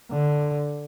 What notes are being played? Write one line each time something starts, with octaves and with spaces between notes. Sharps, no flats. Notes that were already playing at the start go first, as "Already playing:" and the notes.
D3